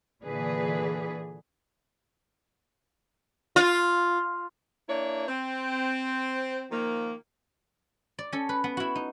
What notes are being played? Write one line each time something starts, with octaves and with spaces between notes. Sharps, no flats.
A#2 D3 E3 G#4 B4
F4
A#3 D4 E4 C#5
C4
D#3 F3 A#3
D5
C#4 A4
B4
B3
E4 F#4
D#4